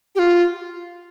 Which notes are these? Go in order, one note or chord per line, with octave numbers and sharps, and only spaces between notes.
G4
F4